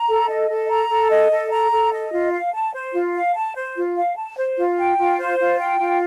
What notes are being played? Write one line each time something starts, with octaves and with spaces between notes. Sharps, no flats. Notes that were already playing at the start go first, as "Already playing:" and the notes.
Already playing: A#5
A4
D#5
A4
A#5
A4
D#5
A4
A#5
A4
D#5
F4
F5
A5
C5
F4
F5
A5
C5
F4
F5
A5
C5
F4
G5
F4
C5
F4
G5
F4